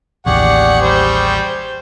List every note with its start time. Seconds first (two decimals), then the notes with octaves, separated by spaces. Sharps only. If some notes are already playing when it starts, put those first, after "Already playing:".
0.26 A1 D#2 G4 G#4 D5 F#5 C#6
0.82 G3 C5